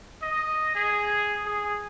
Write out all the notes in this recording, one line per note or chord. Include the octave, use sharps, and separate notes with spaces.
D#5
G#4
G#4